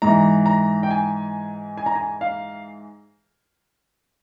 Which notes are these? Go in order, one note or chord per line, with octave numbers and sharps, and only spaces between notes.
G#2 E3 A#5
A#5
G5
G#5
G#5
A#5
G#5
F5